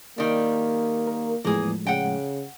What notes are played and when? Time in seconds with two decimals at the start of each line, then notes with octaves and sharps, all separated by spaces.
0.18 D#3 G3 A#3
1.07 A#4
1.45 E2 A2 F3 G#3 A#3 G#4
1.87 C#3 F#5 G5